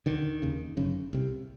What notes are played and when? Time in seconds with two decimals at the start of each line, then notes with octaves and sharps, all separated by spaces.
0.06 D2 D3 D#3
0.42 F1 D#2 C#3
0.77 G1 F#2 C#3
1.13 C2 C3